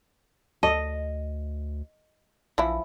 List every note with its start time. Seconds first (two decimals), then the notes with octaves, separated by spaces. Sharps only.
0.63 D2 A4 D#5
2.58 A#1 E3 F3 E4